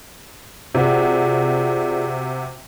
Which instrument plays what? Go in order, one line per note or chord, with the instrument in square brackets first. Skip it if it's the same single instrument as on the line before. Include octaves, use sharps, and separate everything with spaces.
[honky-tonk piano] C3 F#4 [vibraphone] F4 G#4 D5